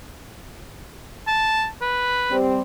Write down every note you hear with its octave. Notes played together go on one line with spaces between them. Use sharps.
A5
B4
G3 C4